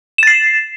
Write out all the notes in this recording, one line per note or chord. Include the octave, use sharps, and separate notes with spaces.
A6 C7 E7